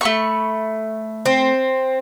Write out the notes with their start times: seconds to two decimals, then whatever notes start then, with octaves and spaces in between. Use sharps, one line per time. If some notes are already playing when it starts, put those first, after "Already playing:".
0.01 A3 B5 C#6
1.26 C4